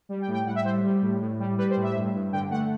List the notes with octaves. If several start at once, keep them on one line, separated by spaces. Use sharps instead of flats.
G3
G5
A2
G5
A2 F#5
E5
G3 C5
G3
A2
A2
G3
G3 B4
C5
A2
E5
G2
G2
D3 G5
A3 F#5